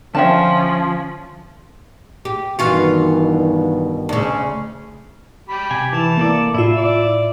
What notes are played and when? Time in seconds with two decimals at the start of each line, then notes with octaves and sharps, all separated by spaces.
0.15 D3 F3 C#4 E5 G5 A5
2.25 G4
2.59 G2 B2 D#3 E3 F4 F#4
4.09 D2 C#3
5.49 G4 B5
5.71 C3 G#5
5.93 E3 A5
6.17 A#3 A4 D5
6.54 A2 E4 F4 E5
6.77 D5